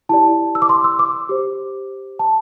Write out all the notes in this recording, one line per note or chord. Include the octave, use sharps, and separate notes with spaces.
E4 G4 D5 A5
E6
D6
C6
E6
D6
G4 C5
A5